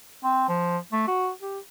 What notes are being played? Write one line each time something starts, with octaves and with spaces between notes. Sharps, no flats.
C4
F3
A3
F#4
G4